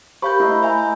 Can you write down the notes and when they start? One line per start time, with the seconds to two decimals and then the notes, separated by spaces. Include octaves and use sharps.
0.22 G4 A#4 C5 F5 B5 C#6 G6
0.40 A3 E4 A#4 D#5
0.63 E5 G#5 G6